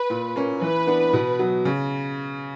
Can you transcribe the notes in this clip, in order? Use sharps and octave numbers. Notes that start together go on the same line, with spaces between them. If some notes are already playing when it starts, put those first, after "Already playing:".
Already playing: B4
A#2
A#3 C#4
E3 B4
B3 D4
B2
F#3 B3
C#3